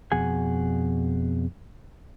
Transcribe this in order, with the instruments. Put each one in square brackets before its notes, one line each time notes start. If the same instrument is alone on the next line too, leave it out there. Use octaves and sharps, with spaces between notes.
[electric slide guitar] F2 B2 G#4 F#5 G#5